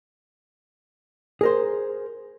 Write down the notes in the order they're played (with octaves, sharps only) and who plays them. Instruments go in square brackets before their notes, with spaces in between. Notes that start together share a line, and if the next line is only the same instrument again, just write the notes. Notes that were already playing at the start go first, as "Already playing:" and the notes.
[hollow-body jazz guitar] G#4 A#4 C5